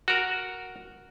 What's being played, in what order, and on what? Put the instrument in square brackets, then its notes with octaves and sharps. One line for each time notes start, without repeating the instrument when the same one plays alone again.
[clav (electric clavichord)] F#4 A#4